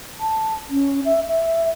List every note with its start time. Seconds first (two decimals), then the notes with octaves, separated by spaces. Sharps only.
0.20 A5
0.70 C#4
1.05 E5
1.28 E5